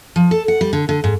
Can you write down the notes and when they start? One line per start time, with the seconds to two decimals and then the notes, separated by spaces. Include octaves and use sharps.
0.16 F3
0.31 A4
0.48 F#5
0.61 G3
0.73 D3
0.89 D3
1.04 G#2